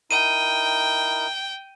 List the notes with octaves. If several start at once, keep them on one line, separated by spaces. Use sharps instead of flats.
D#4 E4 A#4 G5 D#7